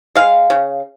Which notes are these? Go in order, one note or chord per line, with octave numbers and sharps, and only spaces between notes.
G#3 F5
C#3